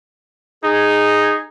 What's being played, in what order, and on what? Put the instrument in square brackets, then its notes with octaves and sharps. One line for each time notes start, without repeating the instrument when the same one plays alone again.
[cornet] D#4 [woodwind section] G#4